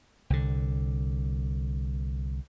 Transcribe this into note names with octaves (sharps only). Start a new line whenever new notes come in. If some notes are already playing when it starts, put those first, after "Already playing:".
C2 D3